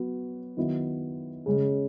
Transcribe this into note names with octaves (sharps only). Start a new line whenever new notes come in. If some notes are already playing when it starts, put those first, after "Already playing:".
Already playing: F#3 B3 F#4
D#3 F#3 B3 E4
C#3 G#3 C#4